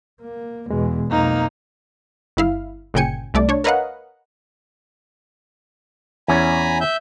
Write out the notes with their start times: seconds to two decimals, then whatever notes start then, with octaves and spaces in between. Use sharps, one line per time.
0.22 A#3
0.71 E2 B2 G#3
1.11 B1 F2 A#3 D#4
2.37 G1 E4 F5
2.94 G1 A#2 C#3 G5 G#5 C#7
3.34 C2 A3 D5
3.49 D4 C#5
3.64 A#4 B4 C#5 D#5 F5 F#5
6.28 E2 C#4 G#5 A#5 B5
6.81 E5 G6